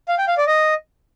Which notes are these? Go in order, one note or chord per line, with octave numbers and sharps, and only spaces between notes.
F5
G5
F5
D5
D#5